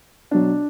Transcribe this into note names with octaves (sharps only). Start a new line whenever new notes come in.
B2 F#3 D4